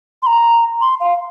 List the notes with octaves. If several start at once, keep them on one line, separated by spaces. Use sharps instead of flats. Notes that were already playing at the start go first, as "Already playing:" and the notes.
C6
A#5
C6
F5